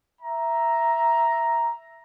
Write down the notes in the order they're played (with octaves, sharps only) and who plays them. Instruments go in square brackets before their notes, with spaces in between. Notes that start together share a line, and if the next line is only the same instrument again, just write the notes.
[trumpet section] E5 A#5